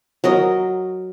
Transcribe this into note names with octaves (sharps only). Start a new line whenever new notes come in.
F#3 A#4 D#5